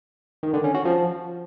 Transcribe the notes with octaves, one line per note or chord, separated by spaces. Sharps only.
D#3
D3
C#4
F#4
F3